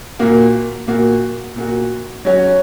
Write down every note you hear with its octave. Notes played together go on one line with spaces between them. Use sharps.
A#2 A#3 F#4
A#2 A#3 F#4
A#2 A#3 F#4
F#3 C#4 F#4 C#5